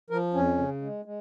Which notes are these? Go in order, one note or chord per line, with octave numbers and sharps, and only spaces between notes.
F3 A#4
F2 C#4
C#3
G#3
G#3